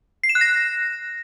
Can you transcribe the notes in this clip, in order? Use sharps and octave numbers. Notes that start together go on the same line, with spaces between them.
C7
E7
F#6
A#6